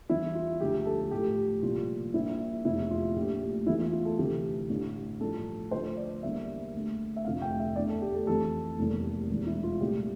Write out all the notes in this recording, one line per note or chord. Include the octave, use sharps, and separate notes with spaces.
E2 E3 G3 E4
F4
E1 D2 D3 F3 G4
A4
A1 A2 F3 G4
C2 A#2 F3 F4
A#1 A#2 G3 A#3 E4
F1 E2 D3 E4
F4
A#1 A#2 A3 G4
E2 E3 A3 E4
F4
F4
A4
D2 C3 E3 G4
A1 G2 D3
A1 G2 F3 A4
D2 D3 F3 A3 C5
D5
E2 D3 G3 A#3 E5
D2 D3 A3
E5
F1 F2 D3 A3 F5
G5
E5
E2 D3 A3 D5
A4
G4
A4
F2 E3 A3 A4
F1 E2 E3 G3 A#3
E1 E2 E3
E4
F4
C2 A#2 A3 G4